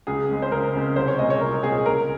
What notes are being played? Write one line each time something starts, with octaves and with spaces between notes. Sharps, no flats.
C#2 G#4
C#3 G#3 C4
C5
C#2 A#4
C#3 G#3 C4
C2 C5
C#5
A#2 G#3 C4 D#5
C#5
C2 A#4
A#2 G#3 C4 G#4
C#2 A#4